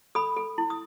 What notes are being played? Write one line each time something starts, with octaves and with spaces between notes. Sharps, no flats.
A4 B5 D#6
A4
E4
D#6